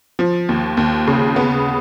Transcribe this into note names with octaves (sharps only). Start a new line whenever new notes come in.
F3
D#2
D#2
C#3
B3